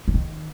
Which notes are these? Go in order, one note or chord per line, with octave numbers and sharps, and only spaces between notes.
E3
D#3